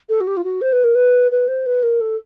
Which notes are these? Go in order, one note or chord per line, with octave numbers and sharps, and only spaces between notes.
A4
F#4
G4
F4
F#4
C5
B4
A#4
B4
B4
C5
B4
A#4
A4